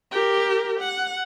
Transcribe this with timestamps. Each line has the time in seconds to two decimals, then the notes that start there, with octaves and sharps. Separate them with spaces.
0.11 G4 A#4
0.80 F#5